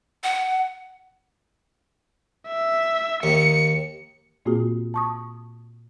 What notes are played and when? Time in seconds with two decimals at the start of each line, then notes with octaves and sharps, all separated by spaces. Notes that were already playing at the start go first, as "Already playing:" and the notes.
0.24 F#5
2.48 E5
3.23 D#2 C#7
4.46 A#2 A#3 C4 F4 F#4 G#4
4.94 A5 C#6 D#6